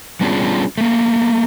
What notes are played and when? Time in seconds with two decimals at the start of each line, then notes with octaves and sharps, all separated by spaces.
0.21 G3 B3 C#4 D4 F4 G#4
0.78 A3 A#3